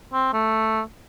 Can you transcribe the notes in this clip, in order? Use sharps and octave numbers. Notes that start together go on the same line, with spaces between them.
C4
A3